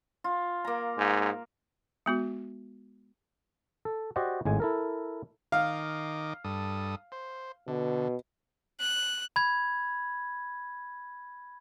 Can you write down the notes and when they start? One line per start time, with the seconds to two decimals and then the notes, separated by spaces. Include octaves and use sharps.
0.24 F4
0.65 A#3 A#5
0.98 G#2
2.06 G#3 B3 F#4
3.85 A4
4.16 F#4 G4 C5 D5 D#5 F#5
4.45 G#1 A2 G#3 G#5
4.60 E4 A4 A#4
5.52 D#3 D#5 F5 D6
6.44 G2 A4 D#6
7.12 C5
7.68 B2 D3
8.80 F#6
9.36 B5 G#6